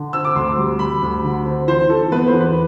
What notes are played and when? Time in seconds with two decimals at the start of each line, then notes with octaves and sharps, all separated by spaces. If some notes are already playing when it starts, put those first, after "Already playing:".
Already playing: D3
0.13 C4 E6
0.24 D6
0.35 D2 C6
0.57 G3
0.79 G3 B5
1.02 D2
1.24 D3
1.45 C4
1.67 E3 C5
1.89 E3 A4
2.12 B3 B4
2.27 C5
2.33 E2
2.41 B4